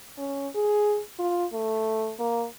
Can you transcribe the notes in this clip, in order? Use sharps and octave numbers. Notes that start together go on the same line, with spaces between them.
C#4
G#4
F4
A3
A#3